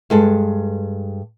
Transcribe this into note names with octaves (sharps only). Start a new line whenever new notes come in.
G2 G#3 A4